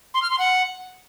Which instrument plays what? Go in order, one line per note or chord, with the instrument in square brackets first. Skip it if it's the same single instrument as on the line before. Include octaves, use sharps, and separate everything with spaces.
[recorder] C6
F6
C6
F#5